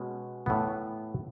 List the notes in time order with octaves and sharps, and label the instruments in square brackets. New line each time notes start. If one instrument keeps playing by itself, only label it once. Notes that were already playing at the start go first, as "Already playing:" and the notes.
Already playing: [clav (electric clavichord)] B2 G#3 C#4
A2 E3 B3